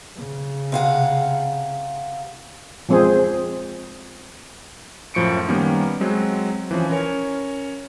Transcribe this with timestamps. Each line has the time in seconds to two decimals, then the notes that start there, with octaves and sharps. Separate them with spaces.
0.16 C#3
0.72 C3 F5 F#5
2.89 F3 G#3 C4 G#4 C5
5.14 F#2 A2 F3 C#6 C#7 D7
5.48 D#3 G3 A#3 B3 C#4 D#4
6.00 F#3 G#3 C4
6.71 E3 F3 C#4
6.89 C#4 A#4 C#5